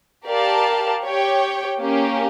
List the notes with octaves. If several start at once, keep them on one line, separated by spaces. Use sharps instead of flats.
G4 A#4 D5 F5 A5
G4 C#5 G5
A#3 C#4 G4